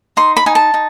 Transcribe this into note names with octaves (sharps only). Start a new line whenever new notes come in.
D#4 C6
B5
D#4 G#5
A5
D#4